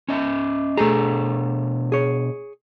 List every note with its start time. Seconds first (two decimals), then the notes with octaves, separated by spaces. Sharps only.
0.09 C#4 D#5 E5
0.77 B2 A3 D4 G#4 A#5
1.92 G#4 C#5